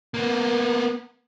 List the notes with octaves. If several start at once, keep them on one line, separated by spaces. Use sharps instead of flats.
A#3 B3